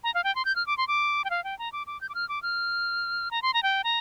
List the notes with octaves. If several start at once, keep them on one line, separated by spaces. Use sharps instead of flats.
A#5
F5
G5
C6
G6
F6
D6
C6
D6
G5
F5
G5
A#5
D6
D6
G6
D6
F6
D6
F6
A#5
C6
A#5
G5
A#5